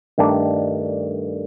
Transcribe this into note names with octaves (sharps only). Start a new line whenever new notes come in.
G2 D#3 A3 D4 A4